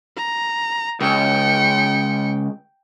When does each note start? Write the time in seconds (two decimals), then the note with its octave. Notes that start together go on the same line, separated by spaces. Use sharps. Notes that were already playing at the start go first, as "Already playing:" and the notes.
0.17 A#5
1.01 C#2 G5 C#7